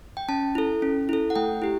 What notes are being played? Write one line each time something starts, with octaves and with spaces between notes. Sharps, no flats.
G5
C#4 A5
E4 A4
C#4
E4 A4
F#5
A3 G5
E4 G4